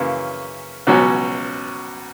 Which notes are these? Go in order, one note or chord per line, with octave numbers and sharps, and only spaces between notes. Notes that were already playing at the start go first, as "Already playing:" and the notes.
Already playing: F#2 C#3 E3 A#3 C#4
C#2 B2 F#3 C#4